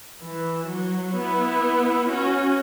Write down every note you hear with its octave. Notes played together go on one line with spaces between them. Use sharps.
E3
F#3
B3 E4
C#4 F#4